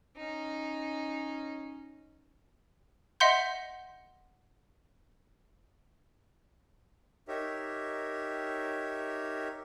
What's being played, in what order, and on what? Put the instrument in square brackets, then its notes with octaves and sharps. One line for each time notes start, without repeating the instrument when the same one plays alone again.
[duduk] C#4 [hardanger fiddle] D#4
[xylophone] D#5 E5 F#5 C6 G6
[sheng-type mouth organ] D#4 G4 A#4 C#5 E5